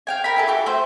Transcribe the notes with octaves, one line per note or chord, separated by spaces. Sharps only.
F5 G5 G#5
A#4 B5
E4 G#4 A4
F#4 G4
A3 C5 G6